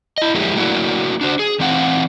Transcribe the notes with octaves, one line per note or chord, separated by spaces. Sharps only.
E4 D#5
F3 F#3 G#3 A#3 E4 G4
F#3 A3 A#3 D4 E4 F#4
D4 F#4 C5
G#4
E3 C4 F5 F#5